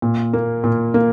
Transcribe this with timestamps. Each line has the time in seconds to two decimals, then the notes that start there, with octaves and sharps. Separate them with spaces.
0.02 A#2
0.33 A#3
0.64 A#2
0.94 A#3